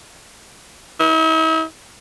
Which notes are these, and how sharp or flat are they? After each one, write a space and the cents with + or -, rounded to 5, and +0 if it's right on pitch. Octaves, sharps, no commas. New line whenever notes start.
E4 -45